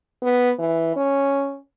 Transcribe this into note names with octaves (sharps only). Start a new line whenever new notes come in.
B3
E3
C#4